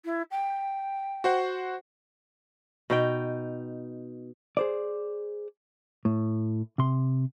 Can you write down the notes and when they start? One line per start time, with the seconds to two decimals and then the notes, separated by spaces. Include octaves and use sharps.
0.05 E4
0.31 G5
1.24 F#4 C5 F#5
2.90 B2 D#4 G5
4.57 G#4 C5 D5
6.05 A2
6.78 C3 C6